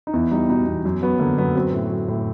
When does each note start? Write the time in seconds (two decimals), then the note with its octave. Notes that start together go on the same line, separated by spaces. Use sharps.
0.07 D#4
0.13 E2 E4
0.31 G3 D#4
0.49 B2 D#4
0.67 E2
0.85 F#2
1.02 F#3 B3
1.19 D3 A#3
1.38 F#2 B3
1.55 F#3 C4
1.73 A2
1.90 F#3
2.08 A2